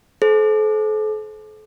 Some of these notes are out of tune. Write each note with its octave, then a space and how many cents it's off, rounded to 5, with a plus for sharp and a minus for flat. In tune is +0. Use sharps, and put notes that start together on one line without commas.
A4 -40 C5 +5